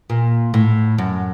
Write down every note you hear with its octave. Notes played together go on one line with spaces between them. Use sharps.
A#2
A2
F#2